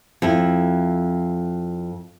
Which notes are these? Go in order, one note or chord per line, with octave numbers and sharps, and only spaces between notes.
F2 E4